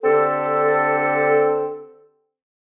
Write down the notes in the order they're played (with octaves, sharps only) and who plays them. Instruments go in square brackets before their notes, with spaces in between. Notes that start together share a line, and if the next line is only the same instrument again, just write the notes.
[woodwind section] D3 C4 G4 A4